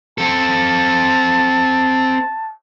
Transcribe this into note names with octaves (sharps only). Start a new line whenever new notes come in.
C4 A4 A5